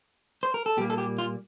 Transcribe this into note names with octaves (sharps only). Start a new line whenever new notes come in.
C5
A#4
A4
A#2 G3 A#3 G4
A4
G4
F4